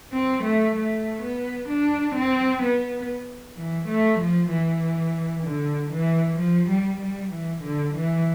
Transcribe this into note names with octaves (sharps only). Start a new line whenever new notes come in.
C4
A3
A3
B3
D4
C4
B3
E3
A3
F3
E3
D3
E3
F3
G3
G3
E3
D3
E3